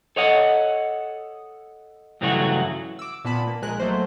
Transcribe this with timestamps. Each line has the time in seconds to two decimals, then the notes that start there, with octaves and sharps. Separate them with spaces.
0.16 A4 C#5 D#5 F#5
2.21 G2 C#3 E3 F#3 A3 F#4
2.99 D6 E6
3.24 A#2 B3 A5 B5
3.47 A#3
3.62 A#1 G#3 A#4 F#6
3.80 F#3 A3 A#3 C5